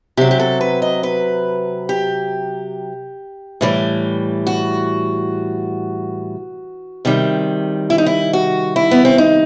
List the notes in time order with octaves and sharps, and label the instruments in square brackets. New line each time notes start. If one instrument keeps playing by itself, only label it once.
[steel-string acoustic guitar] C3 F#3 G4
G4
A4
B4
D#5
B4
G4
A2 E3 G3
F#4
C3 D#3 G3
E4
D#4
E4
F#4
E4
B3
C4
D#4